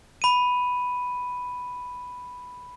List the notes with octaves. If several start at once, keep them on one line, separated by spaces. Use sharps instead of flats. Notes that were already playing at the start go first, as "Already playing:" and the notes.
B5 D#7